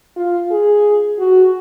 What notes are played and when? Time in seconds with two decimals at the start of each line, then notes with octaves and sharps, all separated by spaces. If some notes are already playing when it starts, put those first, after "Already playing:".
0.16 F4
0.51 G#4
1.19 F#4